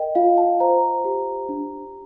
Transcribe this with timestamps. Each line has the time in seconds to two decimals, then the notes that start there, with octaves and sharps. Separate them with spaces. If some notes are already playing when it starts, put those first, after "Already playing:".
Already playing: A#4 D#5 G5
0.15 F4 F5
0.38 A5
0.60 C5 A#5
1.05 G4
1.49 D4